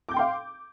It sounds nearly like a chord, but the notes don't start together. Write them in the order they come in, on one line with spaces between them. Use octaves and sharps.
D6 G6 G5 C6 F5